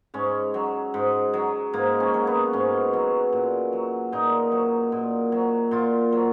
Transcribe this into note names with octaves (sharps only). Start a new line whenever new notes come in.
G#2 C#4
F#3
G#2
F#3
G#2 A#3
C#4
F#3
B3
G#2 C#4
F#3
A#2
F#3
A#2 D#4
F#3
A#2
F#3
A#2 F4
F#3